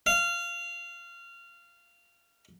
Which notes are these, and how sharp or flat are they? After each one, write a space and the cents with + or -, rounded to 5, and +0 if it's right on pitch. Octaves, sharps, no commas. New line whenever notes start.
F5 -20